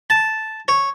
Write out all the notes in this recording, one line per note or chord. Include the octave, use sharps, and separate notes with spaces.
A5
C#5